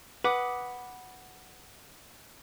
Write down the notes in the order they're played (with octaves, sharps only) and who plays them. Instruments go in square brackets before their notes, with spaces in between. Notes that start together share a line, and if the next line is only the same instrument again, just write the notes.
[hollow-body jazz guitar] B4 [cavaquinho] F#5 D6 D#6